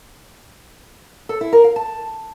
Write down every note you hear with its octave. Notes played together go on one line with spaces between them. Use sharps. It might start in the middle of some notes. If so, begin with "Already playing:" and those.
A4
E4
A#4
F5
A5